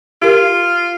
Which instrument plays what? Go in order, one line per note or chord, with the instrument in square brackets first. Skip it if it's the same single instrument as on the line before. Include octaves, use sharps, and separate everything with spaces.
[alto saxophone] F4 [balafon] G4 A#4